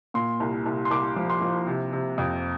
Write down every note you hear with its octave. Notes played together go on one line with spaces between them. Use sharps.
A#2 C6
C2
C2
C6
C2 D6
F3
C6
F3
C3
C3
F2